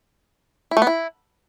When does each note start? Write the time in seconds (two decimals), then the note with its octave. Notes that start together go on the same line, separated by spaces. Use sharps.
0.71 E4
0.77 A3
0.82 B3
0.87 E4